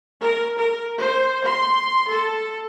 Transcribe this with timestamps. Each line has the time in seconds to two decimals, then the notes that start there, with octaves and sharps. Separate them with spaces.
0.20 A#4
0.57 A#4
0.99 C5
1.43 C6
2.09 A4